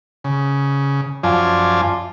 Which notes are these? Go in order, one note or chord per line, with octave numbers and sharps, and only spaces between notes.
C#3
F#2 F3 F4 D5 G#5 A5